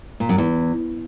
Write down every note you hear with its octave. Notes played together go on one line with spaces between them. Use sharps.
A#2
F#2
E2